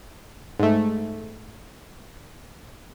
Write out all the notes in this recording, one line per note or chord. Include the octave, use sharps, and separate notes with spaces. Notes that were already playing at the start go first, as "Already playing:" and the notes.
G#2 A3